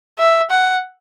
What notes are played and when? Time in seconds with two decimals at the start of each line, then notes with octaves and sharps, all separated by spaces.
0.19 E5
0.50 F#5